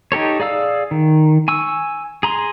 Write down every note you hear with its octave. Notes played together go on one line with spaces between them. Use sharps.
D#4 G4 A4 C#5
G#4 D5 F5 E6
D#3
G#5 C#6 E6
G#4 A#5 C6